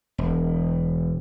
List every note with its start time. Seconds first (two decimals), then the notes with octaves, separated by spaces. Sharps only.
0.18 E1